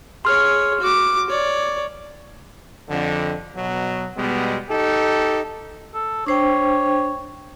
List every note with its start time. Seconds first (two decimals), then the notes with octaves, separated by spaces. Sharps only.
0.25 G#4 C#5 C6 F6
0.80 F#4 D6
1.30 C#5 D5
2.90 F2 D3
3.57 B2 F#3
4.17 B2 G3 G#3 B3
4.69 D#4 G4 A4
5.94 A4
6.26 D4 C5 C#5 G5